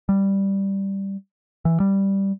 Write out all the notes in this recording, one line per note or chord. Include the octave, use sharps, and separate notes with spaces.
G3
E3
G3